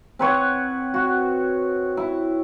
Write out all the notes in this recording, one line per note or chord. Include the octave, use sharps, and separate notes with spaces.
C4 B4 C#5 F#5
F#4
E4